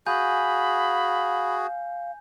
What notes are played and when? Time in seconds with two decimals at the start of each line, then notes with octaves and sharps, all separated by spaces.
0.06 F#4 G#4 F5 G#5 B5 G6